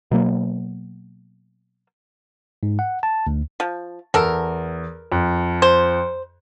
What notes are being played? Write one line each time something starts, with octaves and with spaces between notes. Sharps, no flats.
B2 F#3 A#3
G#2
F#5
A5
D2
F3
E2 A4 A#4
F2
C5